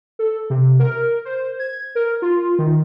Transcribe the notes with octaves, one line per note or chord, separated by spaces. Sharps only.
A4
C3
A#4
C5
G#6
A#4
F4
D#3